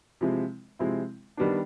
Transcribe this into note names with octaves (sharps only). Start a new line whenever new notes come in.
C3 F3 G#3 C4 E4
C3 F3 G#3 C4 E4
D#3 G3 B3 D4